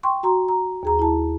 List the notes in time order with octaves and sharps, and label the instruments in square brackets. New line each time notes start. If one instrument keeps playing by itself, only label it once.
[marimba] G5 C6 C#6
F#4 A#5 C6
A#5
D#2 G#4 A#5
E4 A5